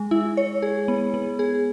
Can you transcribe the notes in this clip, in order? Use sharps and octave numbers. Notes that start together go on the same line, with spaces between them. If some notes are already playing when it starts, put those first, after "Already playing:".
Already playing: G#3
E4
C#5
G#4
B3
B3
G#4